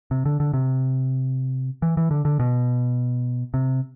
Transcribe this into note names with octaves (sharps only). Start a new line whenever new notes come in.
C3
D3
D3
C3
E3
E3
D3
D3
B2
C3